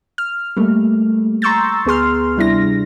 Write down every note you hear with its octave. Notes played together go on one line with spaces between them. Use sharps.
F6
G3 A3 A#3
A#5 C6 C#6 E6 G6 A6
D2 B3 G#4 C6 F6
C3 G3 D4 E4 A#6